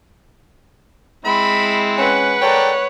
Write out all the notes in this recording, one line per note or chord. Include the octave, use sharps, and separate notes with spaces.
G#3 C4 E4 B5
C#4 B4 F#5
A4 A#4 C#5 D5 G5